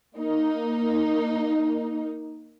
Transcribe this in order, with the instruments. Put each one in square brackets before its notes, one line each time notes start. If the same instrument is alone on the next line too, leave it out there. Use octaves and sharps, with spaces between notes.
[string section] A#3 D#4